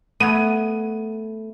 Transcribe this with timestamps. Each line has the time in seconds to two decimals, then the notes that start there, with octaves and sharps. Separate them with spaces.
0.20 A3 B3 F#5 G#6 D#7